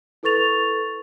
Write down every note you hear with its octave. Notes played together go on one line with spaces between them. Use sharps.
E4 A4 B4 C#6 A6 F7